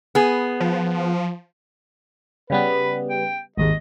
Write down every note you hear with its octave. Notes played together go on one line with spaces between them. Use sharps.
B3 G#4
F3
C#3 G3 B3 B4
G5
G#1 D#2 G#2 D#5